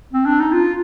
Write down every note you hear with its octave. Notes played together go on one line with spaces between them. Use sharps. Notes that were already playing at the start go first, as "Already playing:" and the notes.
C4
D4
D#4
F4